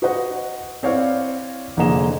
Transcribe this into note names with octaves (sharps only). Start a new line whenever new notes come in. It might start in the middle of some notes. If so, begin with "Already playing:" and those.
F#4 B4 C5 D#5 F#5
C4 E4 C#5 D5 F5
F1 D3 A#3 G#4 D#5 E7